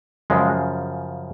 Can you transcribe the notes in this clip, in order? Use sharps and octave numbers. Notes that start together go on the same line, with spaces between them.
F#2 C#3 F3 G#3